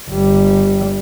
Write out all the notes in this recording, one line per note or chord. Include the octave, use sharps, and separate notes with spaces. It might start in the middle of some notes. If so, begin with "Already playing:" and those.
G1 G3